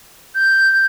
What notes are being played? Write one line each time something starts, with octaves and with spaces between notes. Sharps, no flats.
G6